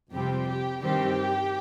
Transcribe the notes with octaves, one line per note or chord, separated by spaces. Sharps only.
F2 C3 G3 C4 G4
G4
G2 D#3 G3 C4 G4